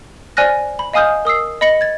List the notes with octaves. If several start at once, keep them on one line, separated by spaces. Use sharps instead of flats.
C5 D5 G#5 F6 F#6 A#6
B5
D#5 F5 G#5 D#6 F6 G6
A#4 D#6 E6 C7
D#5 B5 A#6 C#7 F#7
G#6 A6